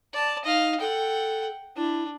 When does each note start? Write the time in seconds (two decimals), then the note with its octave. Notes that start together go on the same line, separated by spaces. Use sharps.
0.13 D5 A5
0.44 D#4 D#5 F5
0.80 A4 F#5 G5
1.76 D4 E4